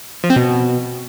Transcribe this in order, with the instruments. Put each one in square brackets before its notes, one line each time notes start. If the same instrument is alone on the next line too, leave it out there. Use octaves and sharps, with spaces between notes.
[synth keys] F3
C4
B2